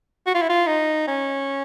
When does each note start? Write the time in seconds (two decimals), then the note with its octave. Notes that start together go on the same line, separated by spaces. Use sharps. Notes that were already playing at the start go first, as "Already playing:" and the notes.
0.27 F#4
0.35 F4
0.42 E4
0.50 F4
0.67 D#4
1.08 C#4